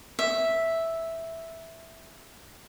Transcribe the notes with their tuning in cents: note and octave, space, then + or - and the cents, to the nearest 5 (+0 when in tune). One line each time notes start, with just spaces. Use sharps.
E5 -5